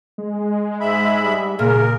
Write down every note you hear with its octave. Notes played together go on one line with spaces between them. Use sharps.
G#3
G#2 E5 B5
G3
A#2 C#3 G#4 A#4